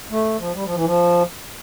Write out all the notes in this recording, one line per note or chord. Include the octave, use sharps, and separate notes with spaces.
A3
F3
G3
F3
E3
F3